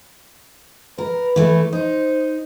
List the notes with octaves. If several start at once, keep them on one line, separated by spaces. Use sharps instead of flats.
A#4 B4
E3 A3
D#4 C5